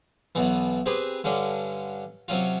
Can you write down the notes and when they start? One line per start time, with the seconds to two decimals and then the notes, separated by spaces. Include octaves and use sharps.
0.35 B1 B2 E3
0.86 C4 G4 G#4 B4
1.24 G2 D3 C#4 D4
2.28 C3 F#3 C#4 F4